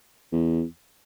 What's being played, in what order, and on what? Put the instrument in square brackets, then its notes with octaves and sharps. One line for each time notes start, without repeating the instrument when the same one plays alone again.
[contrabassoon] E2